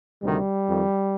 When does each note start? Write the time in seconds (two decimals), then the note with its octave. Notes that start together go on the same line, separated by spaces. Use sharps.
0.22 D2 C3 D#3 G3
0.67 F2 D#3